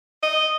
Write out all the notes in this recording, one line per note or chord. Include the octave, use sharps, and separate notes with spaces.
D#5